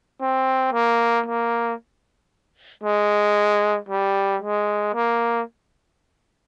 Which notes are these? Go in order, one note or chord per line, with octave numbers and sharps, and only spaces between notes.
C4
A#3
A#3
G#3
G3
G#3
A#3